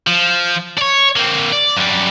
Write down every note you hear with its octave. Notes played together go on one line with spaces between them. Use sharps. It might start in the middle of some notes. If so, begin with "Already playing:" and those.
F3
C#5 D5
A#3 C4
D5
F#2 G3